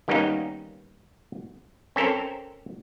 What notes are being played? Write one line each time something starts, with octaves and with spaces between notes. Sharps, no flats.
D#3 G3 A#3 B3 C#4 D#4
C4 C#4 A4 A#4 C5